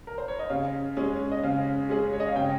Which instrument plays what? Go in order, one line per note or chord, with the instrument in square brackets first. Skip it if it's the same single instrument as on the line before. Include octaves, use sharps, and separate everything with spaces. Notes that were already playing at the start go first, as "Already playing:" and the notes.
[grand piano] A#4
C5
C#5
D#5
[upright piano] C#3 [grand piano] F5
[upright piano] G#3 C#4 G#4
[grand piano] D#5
[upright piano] C#3 [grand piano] F5
[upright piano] G#3 C#4 G#4
[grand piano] C#5
D#5
F5
[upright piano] C#3 [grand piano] G5